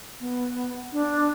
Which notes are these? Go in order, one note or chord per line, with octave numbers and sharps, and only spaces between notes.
B3
D4